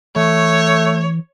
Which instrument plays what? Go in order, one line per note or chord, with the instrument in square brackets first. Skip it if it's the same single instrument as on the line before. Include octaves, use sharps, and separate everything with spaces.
[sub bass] E3 [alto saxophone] A3 [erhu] C#5